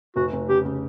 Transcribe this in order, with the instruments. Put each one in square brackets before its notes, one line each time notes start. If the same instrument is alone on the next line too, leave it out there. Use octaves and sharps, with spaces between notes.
[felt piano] F1 [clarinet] F#4
[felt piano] F1
[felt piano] C#3 [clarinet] G4
[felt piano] C#3